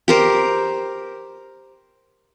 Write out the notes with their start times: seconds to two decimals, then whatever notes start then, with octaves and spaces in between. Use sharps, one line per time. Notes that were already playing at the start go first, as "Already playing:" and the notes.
0.08 G4 A#4 C5